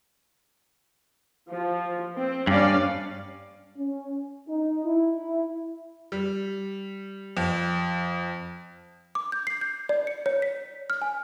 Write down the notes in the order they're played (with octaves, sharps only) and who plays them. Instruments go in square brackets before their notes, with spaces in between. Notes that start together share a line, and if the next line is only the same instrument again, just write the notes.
[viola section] F3
C4
[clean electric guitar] G2 [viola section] C#4 D5 F5
[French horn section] C#4
D#4
E4
[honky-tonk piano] G3
F2
[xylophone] D6
G6
C7
G6
D5
C#7
C#5
B6
F6
G#5